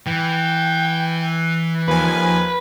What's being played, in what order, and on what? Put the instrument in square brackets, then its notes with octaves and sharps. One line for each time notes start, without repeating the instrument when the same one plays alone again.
[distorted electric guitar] E3 [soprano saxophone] G5
[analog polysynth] D#2 F3 G#5 [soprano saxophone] B4